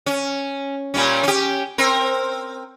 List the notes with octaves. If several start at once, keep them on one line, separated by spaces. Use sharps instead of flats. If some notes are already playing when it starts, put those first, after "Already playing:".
C#4
A#2 G3 C#4
C#4 G4
C4 A#4